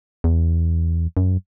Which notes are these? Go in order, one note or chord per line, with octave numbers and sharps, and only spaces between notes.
E2
F#2